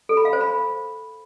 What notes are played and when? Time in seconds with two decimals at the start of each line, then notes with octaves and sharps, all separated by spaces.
0.09 A4
0.17 B5
0.25 F5
0.33 C5
0.41 B5